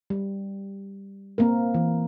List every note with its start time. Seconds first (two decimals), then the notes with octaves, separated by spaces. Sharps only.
0.10 G3
1.38 A#3 C4 A#4
1.74 E3